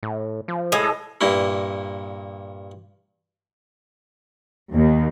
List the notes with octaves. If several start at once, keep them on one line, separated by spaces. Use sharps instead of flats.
A2
F3
A2 G#3
A4
G2 A#2 A#3 E4
D#2